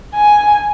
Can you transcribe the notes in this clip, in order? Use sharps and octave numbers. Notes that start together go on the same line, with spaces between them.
G#5